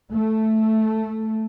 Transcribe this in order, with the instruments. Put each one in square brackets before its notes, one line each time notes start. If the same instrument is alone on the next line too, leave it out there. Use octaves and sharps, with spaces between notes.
[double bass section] A3